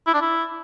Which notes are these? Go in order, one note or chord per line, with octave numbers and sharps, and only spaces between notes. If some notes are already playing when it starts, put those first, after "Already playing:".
E4
D4
E4